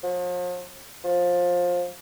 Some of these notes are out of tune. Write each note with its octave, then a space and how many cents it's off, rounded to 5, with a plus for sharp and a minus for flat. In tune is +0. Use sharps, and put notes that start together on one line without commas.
F3 +40
F3 +20